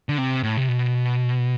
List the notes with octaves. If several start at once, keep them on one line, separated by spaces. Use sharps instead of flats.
D3
C3
A2
C3
B2